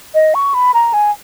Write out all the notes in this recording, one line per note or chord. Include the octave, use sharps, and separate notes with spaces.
D#5
C#6
B5
A#5
G#5